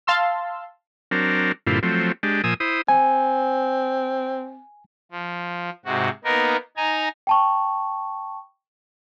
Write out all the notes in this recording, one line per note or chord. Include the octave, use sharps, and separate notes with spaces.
F5 A5 C6 E6
F#3 C4 D4 A#4
G2 A#2 D3 C4 E4 F4
F3 F#3 A3 C4
G#3 D4 G4
A#2 F3 G#5 D#6 E6
E4 C5 D#6
C4 G#5
F3
G#2 C3 F#4
A#3 B3 D#4 A#4
D#4 G#5 A#5
G5 A5 C#6